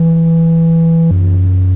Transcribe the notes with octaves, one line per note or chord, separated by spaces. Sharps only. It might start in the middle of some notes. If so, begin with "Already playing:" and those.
Already playing: E3
F#2